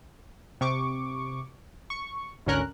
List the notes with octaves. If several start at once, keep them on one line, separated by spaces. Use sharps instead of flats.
C3 C#6 D6
C#6
G#1 D2 D3 C#4 A#4 F#6